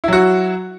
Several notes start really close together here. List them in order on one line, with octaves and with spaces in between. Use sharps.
E4 F#3 F#4